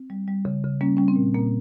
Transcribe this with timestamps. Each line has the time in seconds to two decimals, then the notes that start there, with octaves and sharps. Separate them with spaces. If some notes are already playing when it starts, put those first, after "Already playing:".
Already playing: C4
0.10 G3
0.28 G3
0.45 C#3
0.64 C#3
0.81 G3 A#3 C#4
0.97 G3 C#4
1.08 C4
1.16 A#2
1.34 A#2 A#3